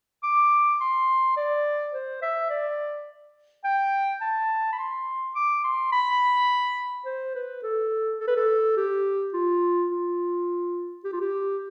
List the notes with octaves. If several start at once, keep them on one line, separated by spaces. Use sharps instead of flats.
D6
C6
D5
C5
E5
D5
G5
A5
B5
C6
D6
C6
B5
C5
B4
A4
A4
B4
A4
G4
F4
F4
G4
F4
G4